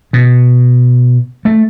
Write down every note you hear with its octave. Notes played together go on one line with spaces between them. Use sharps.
B2
A3